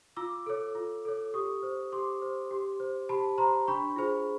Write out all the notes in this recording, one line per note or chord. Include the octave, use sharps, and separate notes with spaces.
F4 D6 E6
A4 C#5
F4
A4 C#5
G4 C#6 D#6
C5
G4 C6 D6
C5
G4
C5
G4 A5 B5
C5 A#5 C6
D4 B5 C#6
F4 G#4 C5